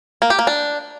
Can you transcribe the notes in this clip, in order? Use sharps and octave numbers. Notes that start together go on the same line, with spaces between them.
A#3
G4
A#3
D4